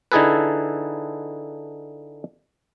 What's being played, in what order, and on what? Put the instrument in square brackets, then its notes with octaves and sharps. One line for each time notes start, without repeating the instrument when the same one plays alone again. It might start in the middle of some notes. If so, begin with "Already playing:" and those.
[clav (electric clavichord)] D3 D#4 E4 G#4 A4 B4